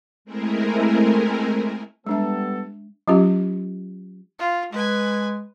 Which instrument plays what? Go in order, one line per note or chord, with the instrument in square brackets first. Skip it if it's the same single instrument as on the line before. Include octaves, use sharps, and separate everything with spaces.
[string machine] G#3 A3 C4 E4 G#4 A#4
[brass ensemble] G3 B3 A4 [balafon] G#3 D4 E5
[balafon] F#3 C#4 F4 G4
[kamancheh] F4
[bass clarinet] G#3 [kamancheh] B4 G#5